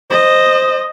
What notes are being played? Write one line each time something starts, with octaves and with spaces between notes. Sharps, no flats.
C5 D#5